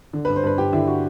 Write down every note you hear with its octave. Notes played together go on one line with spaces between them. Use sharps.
D3
B4
G2
C5
G2 B4
G2 G4
D3 E4
F#4